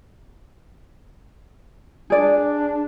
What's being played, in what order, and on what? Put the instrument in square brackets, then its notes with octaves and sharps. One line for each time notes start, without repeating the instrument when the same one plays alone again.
[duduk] D4 [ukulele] G#4 D5